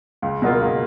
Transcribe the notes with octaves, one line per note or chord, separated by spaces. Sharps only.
C#2
B2 F#3 A#3 F4
C#2